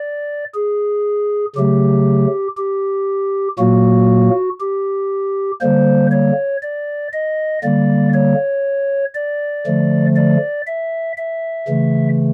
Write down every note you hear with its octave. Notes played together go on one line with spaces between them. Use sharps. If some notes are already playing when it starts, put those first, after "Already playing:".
Already playing: D5
G#4
C#3 F#3 A3 G4
G4
A#2 F#3 A#3 F#4
G4
D3 G3 A#3 C5
C#5
D5
D#5
D3 G3 A#3 D5
C#5
D5
D3 F3 A3
D5
E5
E5
C#3 E3 A3